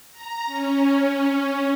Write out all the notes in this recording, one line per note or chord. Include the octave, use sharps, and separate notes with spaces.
A#5
C#4